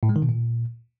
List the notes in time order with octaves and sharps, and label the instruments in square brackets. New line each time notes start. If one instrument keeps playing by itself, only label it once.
[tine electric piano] A2
G#3
D#3
B2
A#2